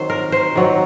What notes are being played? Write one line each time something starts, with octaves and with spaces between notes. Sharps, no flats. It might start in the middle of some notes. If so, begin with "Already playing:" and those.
Already playing: D#3 F#3 C4 C5
A#4
C5
D#3 F#3 C4